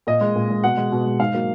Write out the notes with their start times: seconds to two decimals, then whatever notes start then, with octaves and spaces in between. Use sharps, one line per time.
0.07 A#2 D#5
0.21 G#3
0.35 A#2
0.50 G#3
0.63 B2 F#5
0.77 G#3
0.92 B2
1.06 G#3
1.20 G#2 F5
1.34 F#3 A#3